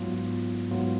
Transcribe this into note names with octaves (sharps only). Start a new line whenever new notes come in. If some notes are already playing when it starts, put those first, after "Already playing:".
Already playing: G#2 F#3 B3 F4
G#2 F#3 B3 F4